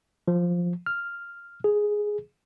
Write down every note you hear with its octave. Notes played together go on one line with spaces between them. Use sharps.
F3
F6
G#4